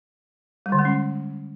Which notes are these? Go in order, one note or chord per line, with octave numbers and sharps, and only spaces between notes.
G3
D3
G#3
C#4